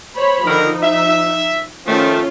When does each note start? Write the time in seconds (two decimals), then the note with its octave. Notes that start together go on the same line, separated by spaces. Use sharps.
0.17 C5 C#5 B5
0.47 D3 D#3 F3 D#4 A#4
0.83 E5
1.87 D#3 F3 A3 C#4 F4